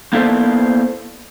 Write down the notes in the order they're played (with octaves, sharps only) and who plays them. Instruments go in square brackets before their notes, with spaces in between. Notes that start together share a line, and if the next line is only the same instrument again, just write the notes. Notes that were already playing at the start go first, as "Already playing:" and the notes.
[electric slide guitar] A#3 B3 E4 A4 C5 D5